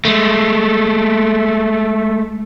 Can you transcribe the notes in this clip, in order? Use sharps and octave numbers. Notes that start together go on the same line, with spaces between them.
G#3 A3